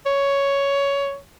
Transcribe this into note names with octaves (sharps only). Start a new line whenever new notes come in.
C#5